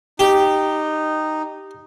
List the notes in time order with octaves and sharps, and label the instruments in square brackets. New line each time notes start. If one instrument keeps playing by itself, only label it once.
[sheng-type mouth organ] D#4 [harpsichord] G4